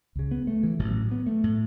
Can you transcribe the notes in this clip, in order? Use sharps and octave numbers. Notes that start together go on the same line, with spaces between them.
C#2 C#3
B3
A3
E3
A1 A2 F#3
B3
A3
A2